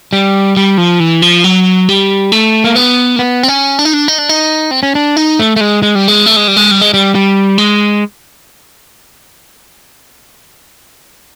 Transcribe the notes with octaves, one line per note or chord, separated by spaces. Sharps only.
G3
G3
F3
E3
F3
F#3
G3
A3
A#3
B3
A#3
B3
C4
C#4
D4
D#4
D4
D#4
D4
D#4
C4
C#4
D4
D#4
A3
A3
G#3
G#3
G3
G#3
A3
G#3
G3
G#3
G3
G#3
G3
G3
G#3